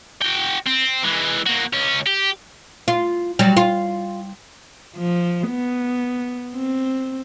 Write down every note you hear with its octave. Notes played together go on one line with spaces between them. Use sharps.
F#4 G5
C4
E3 G#3
A#3 F#4
C#2 C#4
G4
F4
F#3 G3
F4
F3
B3
C4